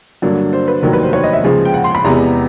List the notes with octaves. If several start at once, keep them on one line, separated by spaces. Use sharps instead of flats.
G2 D3 F#3 A#3 D4
C5
B4
F1 D#2 D#3 F#3 A#4
B4
C5
C#5
D#5
E5
D#2 C#3 F3 G#3
G5
F#5
C6
B5
E2 C3 E3 G#3 B3 A#5